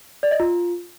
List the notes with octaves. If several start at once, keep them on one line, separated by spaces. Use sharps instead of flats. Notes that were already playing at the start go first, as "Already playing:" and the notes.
D5
D#5
F4